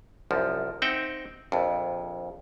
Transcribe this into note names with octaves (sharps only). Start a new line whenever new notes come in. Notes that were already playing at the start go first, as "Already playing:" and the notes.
C2 F#2 F3
C4 D#4 E5 F#5 G5
A#1 F2